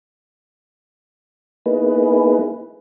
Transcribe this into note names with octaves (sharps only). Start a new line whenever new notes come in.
A#3 B3 D#4 E4 G#4 B4